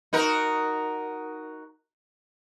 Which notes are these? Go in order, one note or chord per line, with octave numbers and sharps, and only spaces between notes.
D#4 F#4 A#4